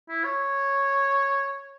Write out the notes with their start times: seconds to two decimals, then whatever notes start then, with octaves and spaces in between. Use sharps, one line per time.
0.09 E4
0.24 C#5